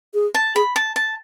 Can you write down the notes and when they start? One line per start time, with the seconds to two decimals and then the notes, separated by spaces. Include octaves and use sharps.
0.14 G#4
0.34 A5
0.55 G#4 B5
0.76 A5
0.96 A5